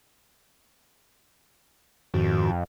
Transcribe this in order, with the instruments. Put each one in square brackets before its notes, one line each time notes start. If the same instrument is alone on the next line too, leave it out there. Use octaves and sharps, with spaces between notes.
[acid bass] F2 [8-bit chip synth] G#2 D#3 F#4